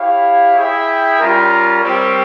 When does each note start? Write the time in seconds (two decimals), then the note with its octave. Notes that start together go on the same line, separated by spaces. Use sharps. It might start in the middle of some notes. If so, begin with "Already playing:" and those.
Already playing: E4 G4 C#5 F5
0.56 E4 G#4 E5 G5
1.18 G3 C#4 F4 A#4
1.81 G3 C4 G4 A#4 C#5